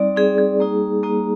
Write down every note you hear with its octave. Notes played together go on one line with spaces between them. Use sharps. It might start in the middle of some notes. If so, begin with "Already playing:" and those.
Already playing: G3 C4 D#4 D5
G3 C4 D#4 G#4
G#4
G3 A#3 D#4
G3 A#3 D#4